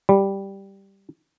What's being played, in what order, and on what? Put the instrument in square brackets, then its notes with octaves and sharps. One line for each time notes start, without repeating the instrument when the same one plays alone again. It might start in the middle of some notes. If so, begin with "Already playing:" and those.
[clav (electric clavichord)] G3